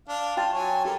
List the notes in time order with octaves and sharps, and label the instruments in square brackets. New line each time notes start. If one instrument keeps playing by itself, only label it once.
[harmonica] D4 F5
[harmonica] F4 [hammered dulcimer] D5 G5 A5
[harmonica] F#3 C#5 G#5
[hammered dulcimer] G4 [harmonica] A4 A#4